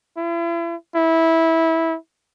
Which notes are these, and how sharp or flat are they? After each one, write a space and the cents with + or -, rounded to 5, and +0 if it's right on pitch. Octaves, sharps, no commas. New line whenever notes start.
E4 +40
E4 -15